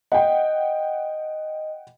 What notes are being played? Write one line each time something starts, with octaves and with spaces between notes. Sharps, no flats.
D#5 F#5 G5